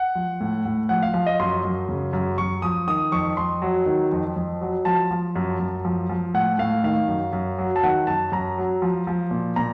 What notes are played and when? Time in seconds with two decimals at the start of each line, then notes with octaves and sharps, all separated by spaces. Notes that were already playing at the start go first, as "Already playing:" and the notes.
Already playing: F#5
0.15 F3
0.40 A2
0.65 A2
0.89 F3 F#5
1.03 F5
1.14 F3 F5
1.26 D#5
1.40 F#2 C6
1.64 F#2
1.89 C#3
2.13 F#2
2.38 F#2 C#6
2.62 F3 D#6
2.88 D#3 D#6
3.12 F2 C#6
3.37 F2 C6
3.62 F#3
3.86 D#3
4.12 F2
4.36 F2
4.61 F#3
4.85 F3 A5
5.11 F3
5.36 F#2
5.59 F#2
5.85 F3
6.09 F3
6.34 A2 F#5
6.59 A2 F5
6.84 D#3 F5
7.08 F#2
7.33 F#2
7.59 F#3
7.76 A5
7.84 D#3 F#5
8.07 F#2 A5
8.32 F#2 A#5
8.58 F#3
8.82 F3
9.07 F3
9.31 A#2
9.56 A#2 A#5